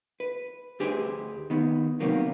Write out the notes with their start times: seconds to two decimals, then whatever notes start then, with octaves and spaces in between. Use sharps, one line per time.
0.20 B4
0.80 D2 D4 G4 G#4 B4 C5
1.50 D#3 B3
2.00 C3 D#3 F#3 A#3 B3